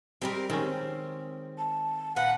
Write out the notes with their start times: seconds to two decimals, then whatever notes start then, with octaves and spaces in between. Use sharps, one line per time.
0.22 G3 G#3 C4 G4 A#4
0.50 D#3 G#3 C4 C#4
1.58 A5
2.16 A#2 B4 F5 F#5